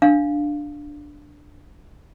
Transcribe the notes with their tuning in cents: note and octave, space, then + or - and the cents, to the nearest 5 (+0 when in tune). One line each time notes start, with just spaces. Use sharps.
D4 +0 F5 +0